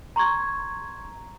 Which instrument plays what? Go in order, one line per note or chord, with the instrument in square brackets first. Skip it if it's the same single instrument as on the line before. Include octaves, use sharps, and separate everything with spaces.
[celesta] A#5 C6 C#6 G#6